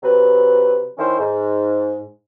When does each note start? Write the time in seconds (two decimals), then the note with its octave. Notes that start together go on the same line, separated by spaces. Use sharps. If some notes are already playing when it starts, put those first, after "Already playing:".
0.03 C3 F#3 B4
0.98 D#3 C#4 E4 C5
1.20 G#2